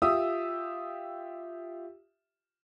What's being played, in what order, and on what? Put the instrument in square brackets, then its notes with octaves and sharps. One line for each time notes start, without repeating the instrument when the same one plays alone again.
[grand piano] F4 G4 E5 D#6 E6